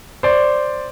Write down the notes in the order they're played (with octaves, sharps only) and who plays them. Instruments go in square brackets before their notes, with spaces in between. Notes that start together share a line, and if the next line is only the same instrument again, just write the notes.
[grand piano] C5 D5